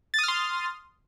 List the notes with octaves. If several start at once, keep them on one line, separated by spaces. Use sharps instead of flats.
C6 D#6 F6 A6